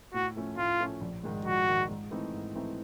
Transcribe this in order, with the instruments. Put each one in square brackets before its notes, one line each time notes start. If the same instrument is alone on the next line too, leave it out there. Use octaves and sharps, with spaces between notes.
[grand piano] A2 [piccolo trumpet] F#4
[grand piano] F3 A3 C#4
[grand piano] A2 [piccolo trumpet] F4
[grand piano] F3 A3 C#4
A#1
G#2 D#3 G#3
[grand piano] A#1 [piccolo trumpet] F#4
[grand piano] G#2 D#3 G#3
G#2
E3 A3 C4 D#4
G#2
E3 A3 C4 D#4